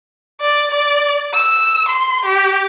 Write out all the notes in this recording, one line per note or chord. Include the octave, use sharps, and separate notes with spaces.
D5
D5
E6
C6
G4